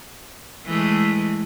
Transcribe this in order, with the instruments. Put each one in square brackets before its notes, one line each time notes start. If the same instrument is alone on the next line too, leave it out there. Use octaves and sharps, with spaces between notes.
[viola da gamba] E3 G#3 A3